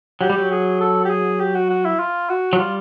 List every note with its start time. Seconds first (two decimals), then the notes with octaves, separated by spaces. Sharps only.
0.21 F#3 G4
0.30 G3
0.38 F#3
0.51 G#4
0.80 A4
1.05 G4
1.10 G#4
1.40 G4
1.55 F#4
1.70 F#4
1.85 E4
1.99 F4
2.29 F#4
2.53 F#3
2.59 G3 F4